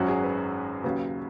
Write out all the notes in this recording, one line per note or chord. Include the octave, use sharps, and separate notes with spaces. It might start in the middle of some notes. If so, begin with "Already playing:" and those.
Already playing: G#1 F#2 F#3 C#4 F#4
G#4
B4
D#2 C#3 F#3 B4